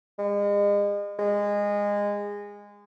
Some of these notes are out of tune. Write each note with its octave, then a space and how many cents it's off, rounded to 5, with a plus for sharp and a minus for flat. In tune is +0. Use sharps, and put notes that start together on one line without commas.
G#3 -35
G#3 -20